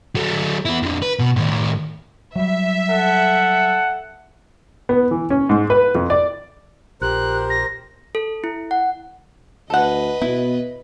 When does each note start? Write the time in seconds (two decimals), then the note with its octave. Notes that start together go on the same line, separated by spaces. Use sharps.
0.15 F#3 A3
0.65 B3 E4
0.83 F2 D3
1.02 B4
1.19 B2
1.36 A2 D#3
2.36 F#3 G3 E5
2.90 A4 F#5
4.89 B3
5.11 E3
5.30 C#4
5.49 G#2
5.70 B4
5.95 F2
6.10 D5
7.01 A#1 G4 A#4 C5 F#6
7.50 A#6
8.15 A4
8.44 E4
8.71 F#5
9.70 D2 A4 B4 D#5 F#5
10.22 B2 B3 E4